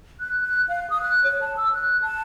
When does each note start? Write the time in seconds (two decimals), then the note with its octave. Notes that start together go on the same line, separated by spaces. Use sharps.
0.20 F#6
0.41 F#6
0.69 F5
0.90 D#6
1.02 F#6
1.24 C#5
1.41 A5
1.57 E6
1.74 F#6
2.02 A5